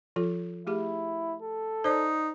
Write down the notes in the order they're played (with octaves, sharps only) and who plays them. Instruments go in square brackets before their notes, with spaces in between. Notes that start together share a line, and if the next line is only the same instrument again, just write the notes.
[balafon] F3 F4 A4
[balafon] A3 G4 G#4 [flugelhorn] E4
[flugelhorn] A4
[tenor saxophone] D#4 [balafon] C5 D5